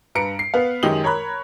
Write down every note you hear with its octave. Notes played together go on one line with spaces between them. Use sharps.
G2 B4 A#5 C#7 D7
C7
B3 B4 F5
F#2 D#3 G#3 G4 D#6 F#7
A#4 C#5 A#5 B5 F#6